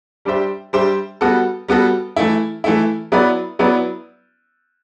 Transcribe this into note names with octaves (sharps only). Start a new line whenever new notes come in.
G3 D4 G4 C5 E5
G3 D4 G4 C5 E5
G3 B3 F#4 A4
G3 B3 F#4 A4
E3 A3 E4
E3 A3 E4
F#3 B3 E4 B4 D5
F#3 B3 E4 B4 D5